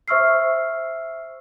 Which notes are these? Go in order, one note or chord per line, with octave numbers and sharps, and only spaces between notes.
C5 E5 C#6 E6 F6 C7